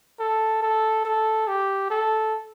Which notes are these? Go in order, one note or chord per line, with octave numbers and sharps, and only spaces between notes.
A4
A4
A4
G4
A4